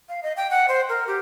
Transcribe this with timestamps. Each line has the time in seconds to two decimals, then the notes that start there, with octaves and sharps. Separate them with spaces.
0.09 F5
0.23 D#5
0.37 G5
0.51 F#5
0.68 C5
0.89 A#4
1.07 G4